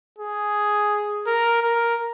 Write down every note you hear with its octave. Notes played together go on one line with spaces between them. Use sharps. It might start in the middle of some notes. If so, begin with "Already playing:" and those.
G#4
A#4
A#4